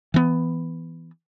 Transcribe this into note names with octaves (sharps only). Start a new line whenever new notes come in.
E3 B3